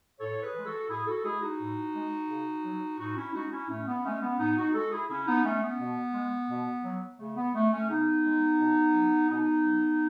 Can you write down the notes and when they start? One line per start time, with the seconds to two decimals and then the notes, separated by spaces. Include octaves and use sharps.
0.19 A2 A4 C#5
0.42 G#4 B4
0.55 E3 G#3
0.66 F#4 A4
0.89 A2 E4 G#4
1.07 F#4 A4
1.25 G#3 E4 G#4
1.42 D#4 F#4
1.60 A2
1.94 G#3
2.30 C#3
2.65 F#3
2.99 A2 D#4 F#4
3.17 C#4 E4
3.34 G#3 D#4 F#4
3.52 C#4 E4
3.69 A2 A3 C#4
3.87 B3
4.05 G#3 A3 C#4
4.22 B3
4.39 A2 B3 D#4
4.57 D#4 F#4
4.74 G#3 F#4 A4
4.92 E4 G#4
5.09 C#3 C#4 E4
5.27 B3 D#4
5.44 G#3 A3 C#4
5.62 B3
5.79 B2
6.14 G#3
6.49 B2
6.84 F#3
7.19 C#3 A3
7.37 B3
7.54 G#3 A3
7.72 A3 C#4
7.88 C#3 B3 D#4
8.24 G#3
8.58 B2
8.93 F#3
9.29 B2 B3 D#4
9.64 F#3